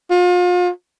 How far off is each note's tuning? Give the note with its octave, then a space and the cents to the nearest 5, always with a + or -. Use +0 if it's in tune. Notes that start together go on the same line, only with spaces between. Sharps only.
F4 +35